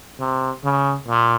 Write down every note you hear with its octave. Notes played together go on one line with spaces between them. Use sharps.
C3
C#3
A#2